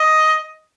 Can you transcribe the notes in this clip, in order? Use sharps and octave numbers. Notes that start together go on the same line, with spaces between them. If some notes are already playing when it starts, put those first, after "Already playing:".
Already playing: D#5